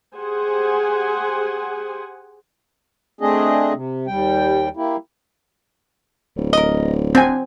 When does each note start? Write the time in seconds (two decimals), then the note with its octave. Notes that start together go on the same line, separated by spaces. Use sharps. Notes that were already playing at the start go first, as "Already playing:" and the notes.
0.16 G4 G#4 C5 F#5 G#5
3.21 A3 C4 D4 G#4 D#5
3.73 C3
4.07 D#2 G3 G5
4.77 A#3 E4 G4
6.37 D1
6.53 A#4 D#5
7.15 C4 D4 G#5